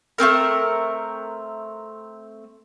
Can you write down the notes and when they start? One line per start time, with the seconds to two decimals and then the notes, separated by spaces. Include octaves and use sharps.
0.18 A3 B3 C4 A#4